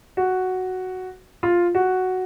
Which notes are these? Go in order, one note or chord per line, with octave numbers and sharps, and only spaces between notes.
F#4
F4
F#4